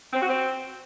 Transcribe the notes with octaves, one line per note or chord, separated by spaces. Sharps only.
C4
F#4
C4